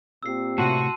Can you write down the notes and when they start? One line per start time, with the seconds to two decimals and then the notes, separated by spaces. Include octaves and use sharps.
0.23 A#2 C4 G4 E6 C7
0.58 A2 C3 F#4 A5 C6 D#7